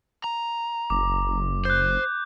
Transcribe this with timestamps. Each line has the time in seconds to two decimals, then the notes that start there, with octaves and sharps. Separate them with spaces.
0.24 A#5
0.90 F#1 D6
1.65 C5 F#6 G6